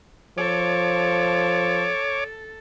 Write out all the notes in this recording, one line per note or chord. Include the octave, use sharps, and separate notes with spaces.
F3 A4 C#5 D6